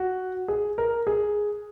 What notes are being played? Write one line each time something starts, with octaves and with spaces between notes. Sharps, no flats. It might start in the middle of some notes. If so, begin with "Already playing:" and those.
Already playing: F#4
G#4
A#4
G#4